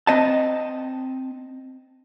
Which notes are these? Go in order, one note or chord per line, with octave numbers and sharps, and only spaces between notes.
C4 D#5 A5